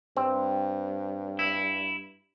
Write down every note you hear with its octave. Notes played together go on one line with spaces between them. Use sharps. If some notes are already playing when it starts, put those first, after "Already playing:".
G2 C4
E4